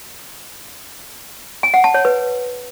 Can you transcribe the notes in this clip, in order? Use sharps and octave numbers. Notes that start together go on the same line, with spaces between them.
G#5
F#5
A5
C#5
B4